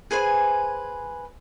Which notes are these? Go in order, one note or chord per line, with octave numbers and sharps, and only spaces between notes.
G#4 B4 C5 G#5